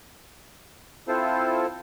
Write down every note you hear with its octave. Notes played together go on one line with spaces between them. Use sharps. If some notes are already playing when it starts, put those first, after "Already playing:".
C4 E4 F4 A4 C5